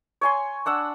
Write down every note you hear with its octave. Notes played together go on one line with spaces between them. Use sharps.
C#5 G#5 C6
D4 F#5 E6